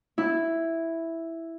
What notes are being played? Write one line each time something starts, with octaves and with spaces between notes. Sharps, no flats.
E4